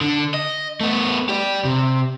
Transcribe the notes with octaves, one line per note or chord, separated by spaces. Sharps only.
D3
D#5
A3 B3
G4 D5
C3